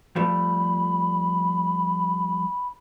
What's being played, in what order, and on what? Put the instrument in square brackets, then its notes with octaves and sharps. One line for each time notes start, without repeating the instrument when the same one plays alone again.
[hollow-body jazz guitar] F3 G3 A3 [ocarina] B5